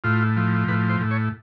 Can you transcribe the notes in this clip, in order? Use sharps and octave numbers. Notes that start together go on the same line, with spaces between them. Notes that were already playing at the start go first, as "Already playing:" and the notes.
A2 F4
F3
A2 B4
C5
A2
C#5